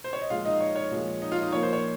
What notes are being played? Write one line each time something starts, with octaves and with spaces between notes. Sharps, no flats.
C5
C#5
D#5
A#2 F3 G#3 F4 F5
D#4 D#5
C#5
C#5
A#2 F3 G#3
D#4 D#5
F4 F5
D#4 D#5
A#2 F3 A#3 C#5
C5
C#5